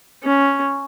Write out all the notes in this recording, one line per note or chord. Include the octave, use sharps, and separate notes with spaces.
C#4